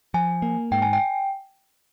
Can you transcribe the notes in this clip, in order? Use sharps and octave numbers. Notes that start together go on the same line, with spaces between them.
F3 G#5
A#3
G#2 G5
G#5
G5